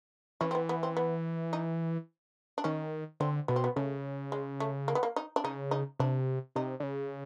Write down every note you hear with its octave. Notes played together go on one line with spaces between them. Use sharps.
E3 C#4
C4
B3
B3
C4
B3
D#4
D4
D#3 C#4
D3 C4
B2 B3
C4
B3
C#3 A3
G#3
A3
A#3
B3
A#3
D#4
D4
C#3 D#4
D#4
C3 D4
C3 D#4
D3
C#3